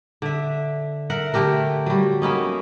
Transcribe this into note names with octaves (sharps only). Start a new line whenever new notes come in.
D3 E5
A#4 E5 F#5
D3 A3 G4 A#4
F#3 G3
A#3 B3 C#4 D#4